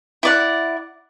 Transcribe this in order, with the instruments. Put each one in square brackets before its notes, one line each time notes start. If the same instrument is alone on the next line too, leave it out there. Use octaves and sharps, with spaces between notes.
[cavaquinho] E4 D5 F#5